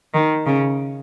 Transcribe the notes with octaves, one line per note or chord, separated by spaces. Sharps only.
D#3
C#3